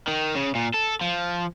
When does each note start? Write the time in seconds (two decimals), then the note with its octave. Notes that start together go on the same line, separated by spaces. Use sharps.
0.08 D#3
0.35 C#3
0.55 A#2
0.74 A4
1.02 F3